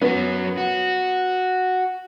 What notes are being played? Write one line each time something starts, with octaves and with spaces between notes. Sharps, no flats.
F#3 B3 C#4
F#4